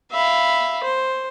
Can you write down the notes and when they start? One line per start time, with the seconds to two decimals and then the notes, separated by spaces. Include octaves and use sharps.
0.11 E5 F5 B5
0.83 C5